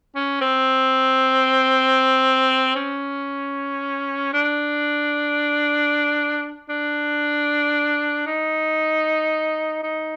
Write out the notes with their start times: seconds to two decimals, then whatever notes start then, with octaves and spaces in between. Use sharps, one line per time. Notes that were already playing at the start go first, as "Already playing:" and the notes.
0.15 C#4
0.41 C4
2.76 C#4
4.33 D4
6.69 D4
8.26 D#4
9.83 D#4